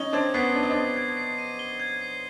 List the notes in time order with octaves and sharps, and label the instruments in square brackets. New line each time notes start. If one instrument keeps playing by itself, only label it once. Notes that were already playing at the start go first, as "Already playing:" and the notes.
Already playing: [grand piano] C#4 D#4 [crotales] G7
[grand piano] C4 D4 [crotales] G#6
[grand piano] B3 C#4 [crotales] C7
[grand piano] D4 [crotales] D#7
[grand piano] D#4
C4 D4
[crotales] G7
G#6
C7
D#7
G7
G#6
C7